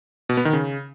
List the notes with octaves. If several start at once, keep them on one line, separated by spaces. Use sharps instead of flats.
B2
B3
D#3
C#3